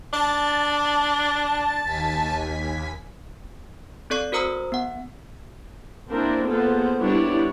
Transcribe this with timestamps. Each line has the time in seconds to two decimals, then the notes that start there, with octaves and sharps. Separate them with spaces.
0.13 D4 A5
1.84 D#2 G#5 B6
4.10 C4 A4 D5 C#6 C7
4.32 F#4 A#4 C5 A#5 D#6 E6
4.72 B3 F#5
6.08 A#3 C4 D4 E4 A#4
6.47 A#3 B3 F4 G#4 A4 C5
6.99 G3 B3 D4 E4 C#5